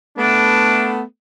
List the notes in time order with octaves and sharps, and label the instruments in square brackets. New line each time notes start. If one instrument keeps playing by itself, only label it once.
[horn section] A3 B3 [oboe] D4